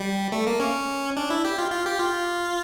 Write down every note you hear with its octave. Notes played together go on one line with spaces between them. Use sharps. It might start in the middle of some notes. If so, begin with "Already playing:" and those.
Already playing: G3
A3
A#3
C#4
D4
E4
G4
F4
F4
G4
F4